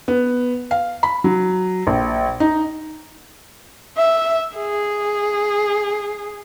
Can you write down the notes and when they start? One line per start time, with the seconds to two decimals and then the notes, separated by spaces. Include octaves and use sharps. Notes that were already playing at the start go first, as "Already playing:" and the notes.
0.08 B3
0.71 F5
1.03 B5
1.24 F#3
1.87 A#1
2.40 D#4
3.97 E5
4.57 G#4